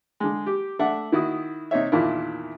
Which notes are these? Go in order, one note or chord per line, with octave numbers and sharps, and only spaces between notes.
D3 G#3
G4
A3 D4 E5 F#5
D#3 E4 F#4 D#6
C3 D#4 C#5 E5
E2 A#2 D#3 D4 E4